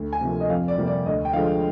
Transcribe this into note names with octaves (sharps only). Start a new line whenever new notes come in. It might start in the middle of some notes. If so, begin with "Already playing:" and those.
Already playing: D2
G#5
C3 F3 A#3
D#5
F2 F5
D5
C3 G3 A#3
D5
D2 D#5
G5
D3 F3 G#3 F5